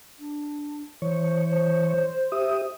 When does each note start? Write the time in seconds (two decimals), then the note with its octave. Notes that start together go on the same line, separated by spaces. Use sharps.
0.18 D4
1.02 E3 C5 C#5
2.32 G4 E5 D#6